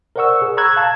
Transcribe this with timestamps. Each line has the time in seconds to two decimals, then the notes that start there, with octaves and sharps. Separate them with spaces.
0.16 A#4 C5 D5 F#5 C#6 E6
0.42 G#4
0.57 A#5 B5 C#6 E6 F#6 G#6
0.76 F5 A5 A#5 G#6